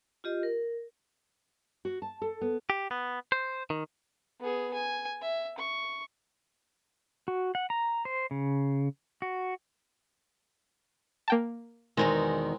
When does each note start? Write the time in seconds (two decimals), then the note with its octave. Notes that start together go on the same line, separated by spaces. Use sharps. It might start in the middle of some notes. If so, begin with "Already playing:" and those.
0.24 F4 G4 D#5
0.43 A#4
1.85 F#4
2.02 A5
2.22 A4
2.41 B3
2.70 G4
2.91 B3
3.32 C5
3.70 D#3
4.40 B3 G#4
4.74 G#5
5.22 E5
5.58 C#6
7.28 F#4
7.55 F#5
7.70 A#5
8.05 C5
8.31 C#3
9.22 F#4
11.28 A#3 G5 A5
11.97 E2 B2 D#3 G#3 C4 A#4